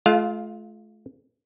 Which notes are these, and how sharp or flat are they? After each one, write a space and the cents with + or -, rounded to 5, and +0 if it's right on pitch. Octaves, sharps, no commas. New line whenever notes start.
A3 -40 F4 +0 F5 +20